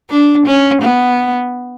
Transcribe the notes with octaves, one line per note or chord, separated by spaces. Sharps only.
D4
C#4
B3